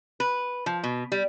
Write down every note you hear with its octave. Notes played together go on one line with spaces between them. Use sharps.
B4
F3
B2
G3